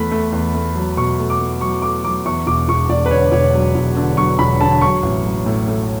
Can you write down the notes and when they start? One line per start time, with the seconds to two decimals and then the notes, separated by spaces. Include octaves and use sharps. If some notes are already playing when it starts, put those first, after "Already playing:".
Already playing: E2 A3 B5
0.11 A3
0.33 E2
0.54 A3
0.76 F#3
0.97 B2 C#6
1.19 A3
1.30 D6
1.40 A3
1.61 F#3 C#6
1.82 A3 D6
2.04 F#3 D6
2.26 E2 C#6
2.47 E1 D6
2.68 E1 C#6
2.89 E1 D5
3.06 B4
3.11 D3 C#5
3.32 E1 C#5
3.54 F#3
3.75 E1
3.97 D3
4.17 F#3 C#6
4.39 E1 B5
4.61 D3 A5
4.81 F#3 C#6
5.03 A1
5.24 F#3
5.46 A2
5.68 A3